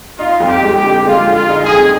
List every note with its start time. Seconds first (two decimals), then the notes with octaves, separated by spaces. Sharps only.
0.18 D#4 F4
0.40 F2
0.48 G4
0.63 G#3
0.76 G4
0.84 D3
1.06 G#3 F4
1.28 D3
1.34 F4
1.49 D#4
1.63 G#4
1.70 F2